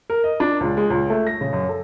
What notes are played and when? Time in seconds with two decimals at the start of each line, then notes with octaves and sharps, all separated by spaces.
0.10 A#4
0.24 D#5
0.40 D4
0.61 C#2
0.77 G#3
0.90 C#2
1.10 A3
1.27 A#6
1.41 C#3
1.53 F#2
1.69 A4